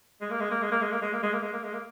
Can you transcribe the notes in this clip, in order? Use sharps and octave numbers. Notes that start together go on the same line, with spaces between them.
G#3
A#3
G#3
A#3
G#3
A#3
G#3
A#3
G#3
A#3
G#3
A#3
G#3
A#3
G#3
A#3